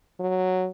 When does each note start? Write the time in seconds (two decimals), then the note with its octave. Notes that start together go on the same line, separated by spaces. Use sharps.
0.20 F#3